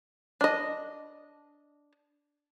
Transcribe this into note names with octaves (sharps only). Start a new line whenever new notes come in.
D4 D#5